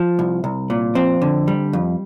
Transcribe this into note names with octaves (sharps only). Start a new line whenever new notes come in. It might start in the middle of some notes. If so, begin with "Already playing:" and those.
Already playing: F3
C2
C2
A#2
F2 C4
D3
G3
F2